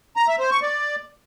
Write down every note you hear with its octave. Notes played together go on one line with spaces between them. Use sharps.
A#5
E5
C5
C#6
D5